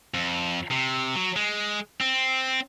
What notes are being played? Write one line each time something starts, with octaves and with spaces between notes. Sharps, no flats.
F2
C3
F#3
G#3
C4